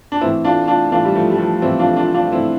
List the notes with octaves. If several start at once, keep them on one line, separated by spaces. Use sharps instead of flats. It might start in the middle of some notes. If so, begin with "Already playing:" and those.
D4
A2 E3 C4 E4
D4 F4
D4 F4
A2 E3 D4 F4
G3
F3 A3
G3
F3 A3
A2 E3 C4 E4
D4 F4
D4 F4
D4 F4
A2 E3 C4 E4